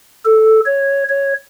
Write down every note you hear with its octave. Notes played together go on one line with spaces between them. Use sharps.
A4
C#5
C#5